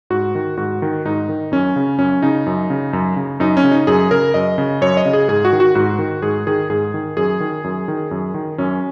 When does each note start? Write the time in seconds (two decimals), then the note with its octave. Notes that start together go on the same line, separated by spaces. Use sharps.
0.10 G#2 F#4
0.35 D#3
0.57 G#2 F#4
0.82 D#3
1.05 G#2 D#4
1.29 D#3
1.52 F#2 C#4
1.76 C#3
1.99 F#2 C#4
2.22 C#3 D#4
2.46 F#2
2.70 C#3
2.93 F#2
3.16 C#3
3.40 F#2 D#4
3.57 C#4
3.63 C#3
3.71 D#4
3.87 F#2 G#4
4.11 C#3 A#4
4.34 F#2 D#5
4.58 C#3
4.81 F#2 C#5
4.97 D#5
5.05 C#3
5.13 G#4
5.28 G#2 G#4
5.45 F#4
5.53 D#3
5.60 F#4
5.75 G#2 F#4
5.99 D#3
6.22 G#2 G#4
6.47 D#3 G#4
6.70 G#2 G#4
6.94 D#3
7.17 F#2 G#4
7.40 D#3
7.64 F#2
7.88 D#3
8.11 F#2
8.34 D#3
8.58 F#2 C#4